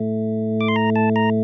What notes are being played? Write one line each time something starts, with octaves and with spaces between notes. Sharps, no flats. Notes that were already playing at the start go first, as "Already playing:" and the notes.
Already playing: A2 A3
D6
C6
A#5
A5
A#5